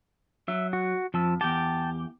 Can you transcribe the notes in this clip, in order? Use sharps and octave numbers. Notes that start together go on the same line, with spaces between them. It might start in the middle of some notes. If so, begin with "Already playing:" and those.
F#3 E5
F#4
F2 F3 A5 E6
E2 G4 G5 A5